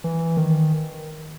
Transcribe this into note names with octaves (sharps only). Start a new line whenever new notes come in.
E3
D#3